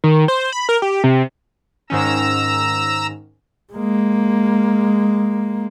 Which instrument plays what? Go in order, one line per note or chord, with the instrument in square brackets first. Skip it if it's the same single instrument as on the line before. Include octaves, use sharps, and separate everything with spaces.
[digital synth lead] D#3
C5
B5
A#4
G4
C3
[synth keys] G#2 D#3 C#4 [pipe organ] A#5 E6
[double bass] G#3 A#3